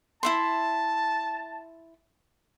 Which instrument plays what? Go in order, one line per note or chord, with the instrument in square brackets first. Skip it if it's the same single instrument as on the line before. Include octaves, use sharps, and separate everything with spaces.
[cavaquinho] E4 E5 C6 [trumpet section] A5